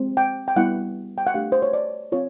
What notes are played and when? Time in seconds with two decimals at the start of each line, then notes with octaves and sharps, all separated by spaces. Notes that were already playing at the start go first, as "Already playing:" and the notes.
Already playing: G#3 C4
0.17 G5
0.48 G5
0.56 G3 B3 E4 F#5
1.18 G5
1.27 F#5
1.34 A3 D4 G4 F5
1.52 C5
1.62 C#5
1.73 D5
2.12 C4 F4 C#5